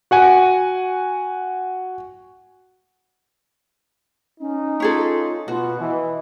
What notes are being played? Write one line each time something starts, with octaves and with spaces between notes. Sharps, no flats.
F#4 F#5 G#5
C#4 D#4
C#4 F4 G#4 A4
B2 F4 F#4
E3 D#5